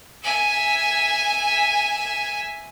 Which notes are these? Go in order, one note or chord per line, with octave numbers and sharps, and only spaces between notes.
E5 G#5